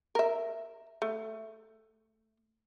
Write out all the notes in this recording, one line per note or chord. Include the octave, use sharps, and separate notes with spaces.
A#4 E5
A3